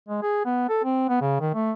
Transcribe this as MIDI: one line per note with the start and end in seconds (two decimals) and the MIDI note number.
0.09 0.22 56
0.22 0.43 68
0.45 0.68 59
0.69 0.80 69
0.84 1.06 60
1.09 1.21 59
1.21 1.39 49
1.41 1.52 51
1.54 1.72 57